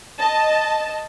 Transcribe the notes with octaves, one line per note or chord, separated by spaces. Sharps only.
D#5 A5